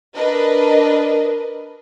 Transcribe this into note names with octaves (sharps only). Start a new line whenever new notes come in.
D4 A#4 B4 D#5